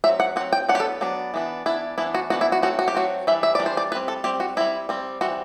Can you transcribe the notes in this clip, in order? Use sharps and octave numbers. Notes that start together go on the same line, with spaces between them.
F#3 C4 E5
F#5
F#3 C4 F#5
G5
F#3 B3 D4 F#5
G4
A4
F#3 B3 D4
E3 B3 D4
E3 B3 D4 E4
E3 B3 D4 E4
F#4
E3 B3 D4 F#4
E4
F#4
F#3 A3 C4 F#4
F#4
G4
F#3 A3 C4 F#4
E3 G3 D4 E5
E5
E3 G3 D4 D5
C5
D5
G3 C4 B4
A4
G3 C4 G4
F#4
G3 C4 E4
G3 C4
E3 G3 C4 F#4